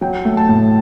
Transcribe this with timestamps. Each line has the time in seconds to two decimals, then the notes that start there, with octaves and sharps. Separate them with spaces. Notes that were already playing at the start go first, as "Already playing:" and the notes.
0.01 F#3 G5
0.25 A3
0.37 A5
0.49 A2